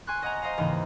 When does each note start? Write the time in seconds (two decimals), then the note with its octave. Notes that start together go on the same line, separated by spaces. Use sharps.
0.07 G#5 C6 C#6 F#6
0.22 D#5 F#5 G#5 A#5
0.42 C5 D#5 F5 A#5
0.58 D#2 G#2 C#3 E3